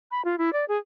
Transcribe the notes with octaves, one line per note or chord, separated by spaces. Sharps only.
B5
F4
E4
D5
G#4